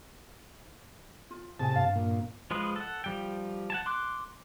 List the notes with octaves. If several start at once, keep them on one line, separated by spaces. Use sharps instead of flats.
F4
A2 C3 G#4 G#5 A5
G2 F5
A#2
F3 G#3 G#4 B4
A4 F#5
F3 G3 G5
F#5 G#5 A5
C6 D6 F#6